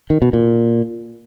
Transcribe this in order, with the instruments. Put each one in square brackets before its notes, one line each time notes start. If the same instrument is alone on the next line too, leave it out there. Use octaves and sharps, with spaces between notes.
[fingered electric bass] D#3
B2
A#2